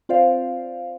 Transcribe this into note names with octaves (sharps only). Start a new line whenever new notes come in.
C4 F4 C5 D5 F5